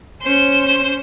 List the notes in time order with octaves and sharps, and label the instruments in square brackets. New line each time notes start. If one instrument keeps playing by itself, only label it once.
[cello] C#4 C5